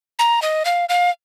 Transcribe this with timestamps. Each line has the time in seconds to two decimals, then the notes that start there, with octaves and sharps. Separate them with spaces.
0.19 A#5
0.42 D#5
0.65 F5
0.89 F5